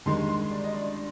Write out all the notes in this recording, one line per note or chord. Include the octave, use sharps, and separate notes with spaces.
G2 D#3 G#3 D#4 C6
C6
D5
D#5
D5